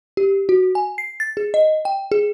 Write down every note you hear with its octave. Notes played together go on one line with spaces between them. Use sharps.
G4
F#4
G#5
C7
A6
G#4
D#5
G5
G#4